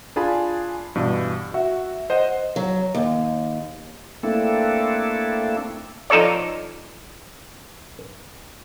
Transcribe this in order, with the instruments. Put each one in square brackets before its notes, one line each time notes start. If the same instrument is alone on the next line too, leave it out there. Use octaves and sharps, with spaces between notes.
[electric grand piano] D4 F4 G#4 G#5 A5 B5
G2 B2 E3
F#4 E5 F#5
C5 D#5 F#5
[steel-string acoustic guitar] F#3
D#2
[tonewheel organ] A3 A#3 C4 D4 E4 A4
[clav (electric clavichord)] F3 D#4 A4 C#5 D5